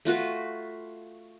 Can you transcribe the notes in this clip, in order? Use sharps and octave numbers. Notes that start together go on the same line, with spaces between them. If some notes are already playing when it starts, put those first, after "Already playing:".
A3 F4 F#4 B4